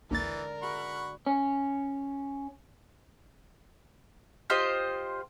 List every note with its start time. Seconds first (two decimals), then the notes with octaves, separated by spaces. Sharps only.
0.11 A#1 D#2 G#2 D3 E3 A#4 A6
0.62 F#4 G#4 E5 F#5 B5 C#6
1.27 C#4
4.50 F4 G4 C5 D#5